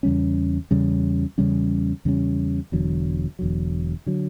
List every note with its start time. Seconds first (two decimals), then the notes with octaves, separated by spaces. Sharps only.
0.03 E2 C#3 G3 C#4
0.71 E2 C#3 G3 C#4
1.38 E2 C#3 G3 C#4
2.05 E2 C#3 G3 C#4
2.72 E1 E2 D3 F#3
3.39 E1 E2 D3 F#3
4.06 D3 F#3